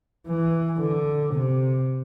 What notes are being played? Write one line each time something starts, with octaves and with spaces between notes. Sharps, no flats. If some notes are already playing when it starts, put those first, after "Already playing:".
E3
D3
C3